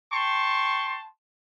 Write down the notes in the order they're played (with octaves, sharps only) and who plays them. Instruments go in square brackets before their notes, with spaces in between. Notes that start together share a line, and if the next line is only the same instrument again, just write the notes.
[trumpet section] G5 A5 C6 C#6